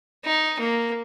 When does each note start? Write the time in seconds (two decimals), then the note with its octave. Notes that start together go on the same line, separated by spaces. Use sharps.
0.25 D#4
0.60 A#3